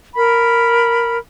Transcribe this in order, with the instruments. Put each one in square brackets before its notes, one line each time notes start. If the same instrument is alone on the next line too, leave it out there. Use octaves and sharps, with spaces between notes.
[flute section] A#4 B5